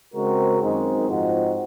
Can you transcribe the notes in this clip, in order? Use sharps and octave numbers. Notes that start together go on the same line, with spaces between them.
C#3 G#3 C4 F#4 A#4
F#2 D#3 G#3 C4 D#4
G#2 F3 C4 D#4 F#4